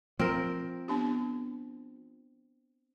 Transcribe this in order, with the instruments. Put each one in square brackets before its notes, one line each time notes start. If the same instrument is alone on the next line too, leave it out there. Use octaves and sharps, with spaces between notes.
[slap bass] F3 [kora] C4 A#4
[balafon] B3 D4 G4